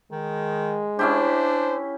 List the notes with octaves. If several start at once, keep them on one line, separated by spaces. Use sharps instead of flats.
D#3 G#3
C#4 D4 E4 G4 C5